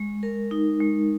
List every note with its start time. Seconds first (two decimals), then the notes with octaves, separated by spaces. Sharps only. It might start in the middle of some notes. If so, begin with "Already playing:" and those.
Already playing: G#3
0.23 A#4
0.51 D#4
0.81 G#3